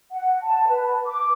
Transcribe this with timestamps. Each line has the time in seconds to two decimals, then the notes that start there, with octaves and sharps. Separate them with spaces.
0.12 F#5
0.43 A5
0.68 B4
1.07 D6